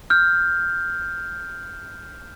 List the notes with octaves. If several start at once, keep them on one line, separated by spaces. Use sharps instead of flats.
F6 G6